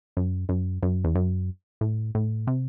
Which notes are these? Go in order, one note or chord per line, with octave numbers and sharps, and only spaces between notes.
F#2
F#2
F#2
E2
F#2
A2
A2
C3